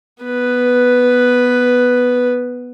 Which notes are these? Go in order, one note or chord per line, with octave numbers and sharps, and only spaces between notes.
B3 B4